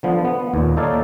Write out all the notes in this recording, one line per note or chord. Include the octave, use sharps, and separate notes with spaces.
D3 F3 B3
B3
D#2 A#2
D#4 A4 C#5 D5 F5